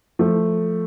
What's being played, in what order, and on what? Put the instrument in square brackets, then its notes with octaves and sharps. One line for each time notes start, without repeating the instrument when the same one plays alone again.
[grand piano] F3 A3